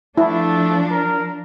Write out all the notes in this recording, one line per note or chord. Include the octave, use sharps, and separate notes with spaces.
F3 A3 D4 E4
A#4